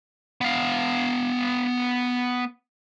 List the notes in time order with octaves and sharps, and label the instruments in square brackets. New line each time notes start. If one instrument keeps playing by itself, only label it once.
[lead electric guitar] B3 F5